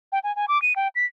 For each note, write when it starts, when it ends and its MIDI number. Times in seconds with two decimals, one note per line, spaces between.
0.12 0.19 79
0.24 0.35 80
0.36 0.46 80
0.48 0.61 86
0.62 0.73 99
0.76 0.88 79
0.95 1.05 95